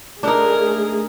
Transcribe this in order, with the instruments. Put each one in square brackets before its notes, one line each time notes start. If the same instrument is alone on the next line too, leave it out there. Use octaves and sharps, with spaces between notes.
[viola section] A3 G#4 [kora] D4 D#4 [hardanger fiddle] A#4